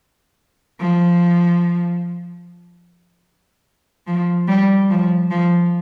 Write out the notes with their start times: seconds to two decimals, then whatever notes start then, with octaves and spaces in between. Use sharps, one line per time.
0.81 F3
4.07 F3
4.48 G3
4.90 F3
5.31 F3